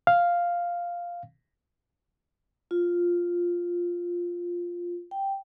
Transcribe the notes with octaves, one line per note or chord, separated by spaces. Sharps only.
F5
F4
G5